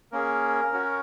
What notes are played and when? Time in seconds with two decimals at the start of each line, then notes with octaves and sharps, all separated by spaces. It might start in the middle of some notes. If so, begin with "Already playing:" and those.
0.12 A#3 C#4 G#4 A#4
0.72 C#4 F#4